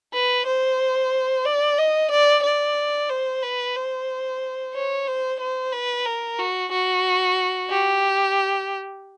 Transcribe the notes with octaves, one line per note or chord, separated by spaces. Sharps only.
B4
C5
D5
D#5
D5
D5
C5
B4
C5
C#5
C5
C5
B4
A#4
F#4
F#4
G4